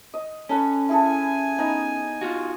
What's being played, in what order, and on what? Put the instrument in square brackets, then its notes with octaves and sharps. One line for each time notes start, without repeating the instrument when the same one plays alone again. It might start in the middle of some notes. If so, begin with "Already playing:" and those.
[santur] D#5
[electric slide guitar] C#4 [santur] A4 B4
[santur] E4 G#4 A4 [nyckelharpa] G#5
[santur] B3 D#4 A#5
[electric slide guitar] F4 F#4